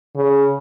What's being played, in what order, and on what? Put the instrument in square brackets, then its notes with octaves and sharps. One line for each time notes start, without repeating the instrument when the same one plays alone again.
[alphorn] C#3